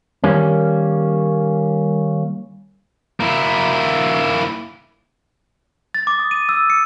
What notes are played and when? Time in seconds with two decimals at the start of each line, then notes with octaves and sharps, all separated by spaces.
0.24 D#3 G3 A#3 C#4
3.20 A#3 E4
5.95 A6
6.07 D6
6.20 D#6
6.31 D#7
6.49 E6
6.70 C#7